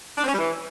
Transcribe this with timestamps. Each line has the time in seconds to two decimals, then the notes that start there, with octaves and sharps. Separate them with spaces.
0.17 D4
0.23 C4
0.28 C#4
0.33 G3
0.38 E3